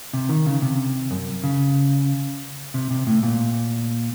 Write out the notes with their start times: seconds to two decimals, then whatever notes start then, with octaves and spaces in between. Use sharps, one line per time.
0.13 C3
0.29 D#3
0.46 C#3
0.62 C3
1.11 F#2
1.44 C#3
2.74 C3
2.91 C3
3.07 A2
3.23 A#2